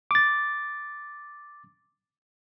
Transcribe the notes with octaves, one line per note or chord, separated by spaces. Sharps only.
D6 A6